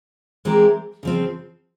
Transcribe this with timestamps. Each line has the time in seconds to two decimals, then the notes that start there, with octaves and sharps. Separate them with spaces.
0.45 E3 G#3 C4 G4 A#4
1.03 C#3 F3 C4